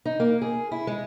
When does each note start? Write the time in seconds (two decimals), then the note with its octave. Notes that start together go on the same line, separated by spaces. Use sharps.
0.05 D#4
0.20 A#3
0.42 G#4
0.71 E4
0.87 G#3